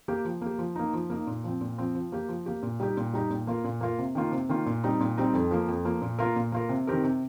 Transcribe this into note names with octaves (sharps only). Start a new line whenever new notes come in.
A#3 G4
F3
A#3 G4
F3
A#3 D#4
F3
A#3 D#4
A#2
F3 C4
A#2
F3 C4
F3
A#3 G4
F3
A#3 G4
A#2
G3 D#4 G4
A#2
G3 D#4 G4
A#2
A#3 F4 A#4
A#2
A#3 F4 A#4
C3
D#3 A#3 F4
C3
D#3 A#3 F4
A#2
G3 C4 D#4
A#2
G3 C4 D#4
F2
F3 A#3
F2
F3 A#3
A#2
A#3 F4 A#4
A#2
A#3 F4 A#4
C3
D#3 C4 G4 A#4
C3